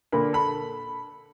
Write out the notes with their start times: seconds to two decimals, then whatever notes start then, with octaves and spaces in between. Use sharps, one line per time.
0.12 A#2 D3 A#3 B5
0.33 A4 B5